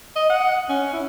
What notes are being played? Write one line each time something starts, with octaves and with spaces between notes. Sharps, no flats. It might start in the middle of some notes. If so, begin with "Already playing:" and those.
D#5
F#5
C#4
E4